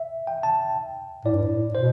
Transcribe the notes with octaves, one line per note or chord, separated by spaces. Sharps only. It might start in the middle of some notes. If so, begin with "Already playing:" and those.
Already playing: E5
G5
A5
A2 D5
G2
A2
B2 C5